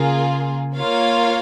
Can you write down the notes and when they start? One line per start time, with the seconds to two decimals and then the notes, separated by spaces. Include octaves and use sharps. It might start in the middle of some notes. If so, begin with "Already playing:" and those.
Already playing: C#3 A#3 F4 G#4
0.76 A#3 F4 C#5 F5